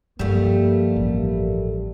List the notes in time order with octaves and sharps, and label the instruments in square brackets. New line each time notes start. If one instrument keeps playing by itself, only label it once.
[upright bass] G2 F3 [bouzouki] G3 A3 [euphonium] A#3
[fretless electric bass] A1